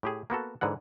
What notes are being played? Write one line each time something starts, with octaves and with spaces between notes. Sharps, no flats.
A2 G4 G#4
A#3 B3 F#4 A4
G#2 D3 E3 F#5